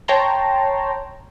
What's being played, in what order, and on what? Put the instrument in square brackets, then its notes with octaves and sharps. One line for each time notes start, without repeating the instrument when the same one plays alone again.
[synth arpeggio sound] C#5 G5 A5 A#5 C6